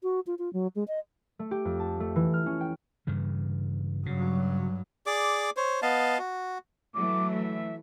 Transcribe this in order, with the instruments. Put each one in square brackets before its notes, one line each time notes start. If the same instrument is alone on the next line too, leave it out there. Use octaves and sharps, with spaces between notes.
[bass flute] F#4
F4
F4
F#3
G#3
D#5
[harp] A3
G4
F2
A5
A3
E3
F6
C#4
G5
[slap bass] G2 C#3 E3
[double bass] G2 F#3 [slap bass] C#3
[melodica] G#4 D5 D6
C5 C#5
B3 D#5 F5 A5
F#4
[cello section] E3 F#3 A3 [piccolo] D6
[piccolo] E5